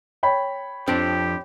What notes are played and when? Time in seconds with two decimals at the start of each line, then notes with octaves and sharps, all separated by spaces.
0.23 C#5 G5 B5
0.88 F2 F3 C4 D4 G4 D5